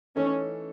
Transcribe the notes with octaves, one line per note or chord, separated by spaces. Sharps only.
E3 A3 C#4 D#4 A4